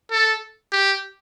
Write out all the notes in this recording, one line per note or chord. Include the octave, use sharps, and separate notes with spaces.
A4
G4